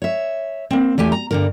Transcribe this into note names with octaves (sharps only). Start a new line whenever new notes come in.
C#5 E5
A#3 C4
E2 A3 G4 G#5
A#5
G2 D3 A#4